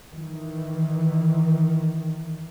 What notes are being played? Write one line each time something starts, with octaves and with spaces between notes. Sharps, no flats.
D#3 E3